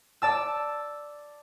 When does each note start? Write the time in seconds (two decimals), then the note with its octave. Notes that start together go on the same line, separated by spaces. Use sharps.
0.22 D5 A5 E6